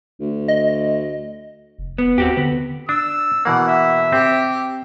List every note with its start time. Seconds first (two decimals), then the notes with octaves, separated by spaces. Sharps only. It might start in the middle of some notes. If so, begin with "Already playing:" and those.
0.21 D2
0.48 D#5
1.78 F1
1.98 B3
2.18 D#2 C4 F#4 G4
2.37 D3 B3
2.89 D4 E6
3.45 B2 E3 A#3 F#5
3.68 E5
4.13 C4 G4